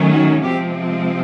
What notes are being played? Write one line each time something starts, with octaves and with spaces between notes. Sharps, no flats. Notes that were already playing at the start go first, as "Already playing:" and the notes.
Already playing: D#3 F#3 A3 C#4
F#4
C3 F3 G#3 C4 G4